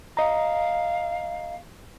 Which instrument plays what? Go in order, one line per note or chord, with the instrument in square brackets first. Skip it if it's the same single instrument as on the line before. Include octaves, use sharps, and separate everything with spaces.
[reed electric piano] D#5 A#5 [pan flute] F5